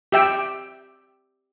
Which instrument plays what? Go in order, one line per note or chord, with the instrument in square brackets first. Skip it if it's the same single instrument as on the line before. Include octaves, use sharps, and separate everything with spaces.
[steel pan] G4 E5 G5